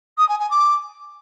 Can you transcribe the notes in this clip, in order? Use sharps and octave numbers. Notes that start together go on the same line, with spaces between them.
D#6
G#5
G#5
D6